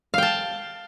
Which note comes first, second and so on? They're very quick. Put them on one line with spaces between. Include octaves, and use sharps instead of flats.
F5 G5 A5